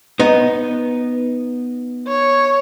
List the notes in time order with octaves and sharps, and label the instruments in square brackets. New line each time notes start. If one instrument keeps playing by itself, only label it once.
[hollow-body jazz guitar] B3 D#4
[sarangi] C#5